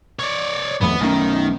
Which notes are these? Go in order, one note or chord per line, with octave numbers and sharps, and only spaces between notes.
C#5 D5
G#1 F2 A3 B3
B1 D#3 A3 C#4